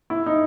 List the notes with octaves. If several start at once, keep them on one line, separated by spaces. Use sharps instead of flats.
E4
D#4